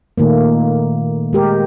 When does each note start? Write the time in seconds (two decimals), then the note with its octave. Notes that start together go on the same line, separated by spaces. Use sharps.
0.18 A#2 D#3 A3 A#3
1.33 G#3 G4 A#4